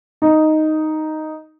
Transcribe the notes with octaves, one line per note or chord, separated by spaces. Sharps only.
D#4